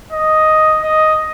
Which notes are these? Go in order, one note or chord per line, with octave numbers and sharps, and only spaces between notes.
D#5
D#5